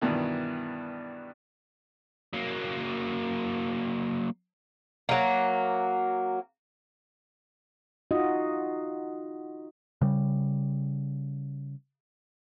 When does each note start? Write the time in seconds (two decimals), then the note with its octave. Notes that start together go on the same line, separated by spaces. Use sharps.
0.01 G2 B2 D#3 E3
2.33 F#3 A#3
5.09 F#3 A#3
8.11 D#4 F4 F#4 D#5
10.01 C#3 G3